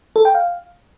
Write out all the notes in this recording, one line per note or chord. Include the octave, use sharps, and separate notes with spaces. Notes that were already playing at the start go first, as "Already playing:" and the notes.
A4
G5
F5